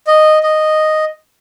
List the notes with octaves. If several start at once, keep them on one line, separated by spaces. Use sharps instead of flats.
D#5
D#5